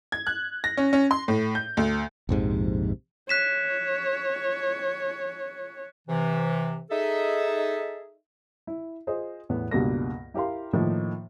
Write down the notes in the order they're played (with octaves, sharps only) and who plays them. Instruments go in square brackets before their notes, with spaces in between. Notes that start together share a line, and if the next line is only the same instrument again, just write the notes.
[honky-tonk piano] G#6
F#6
A#6
C#4
C#4
C6
A2
G6
D2
[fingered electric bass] A#1 F2 G#2 C3
[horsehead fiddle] C#5 [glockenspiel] F#6 B6 E7
[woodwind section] C3 E3
D#4 G#4 A4 E5
[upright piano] E4
F4 G#4 C5 D#5
E2 A2 B3
C#2 G2 B2 A#3 A#6
E4 G4 A#4 F5 C6
A2 D#3 F3 A#3